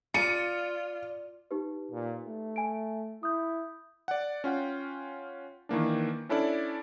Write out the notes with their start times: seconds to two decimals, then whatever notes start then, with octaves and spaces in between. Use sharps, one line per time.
0.14 F4 D5 C#7 D#7
1.51 D#4 G4 B4
1.91 A#2
2.26 A3
2.56 G#5 D7
3.23 E4 D#6 G6
4.08 D5 F#5
4.44 C#4 F4 F#5 G5
5.69 D#3 E3 A#3 D4
6.29 C#4 D4 E4 A4 D5